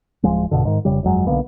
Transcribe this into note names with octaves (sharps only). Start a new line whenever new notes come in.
D1 F3 G#3
A#1 G2 B2 D3
G#2 D#3
F1 C#3 G3
G1 F2 F#3 G#3
B1 D3 A#3 B3